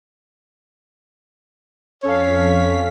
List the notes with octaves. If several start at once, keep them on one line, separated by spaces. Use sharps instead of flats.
F2 C#4 A4 C#5 F5 B6